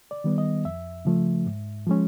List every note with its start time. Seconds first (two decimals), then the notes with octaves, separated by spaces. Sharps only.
0.11 D5
0.24 D#3 G3 B3
0.38 D#5
0.65 F2 E5
1.05 C#3 F3 A3
1.46 G#2
1.86 F3 G#3 C#4